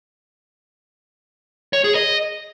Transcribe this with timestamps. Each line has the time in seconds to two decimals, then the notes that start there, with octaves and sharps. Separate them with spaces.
1.73 C#5
1.84 G#4
1.95 D#5